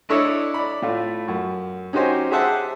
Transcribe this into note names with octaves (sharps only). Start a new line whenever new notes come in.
D4 E4 A4 C#5 D#5 E5
D5 B5
A2 A3 F4
F#2
C#4 D#4 F#4 G4 C5 G#5
G4 G#4 C5 E5 F#5 A5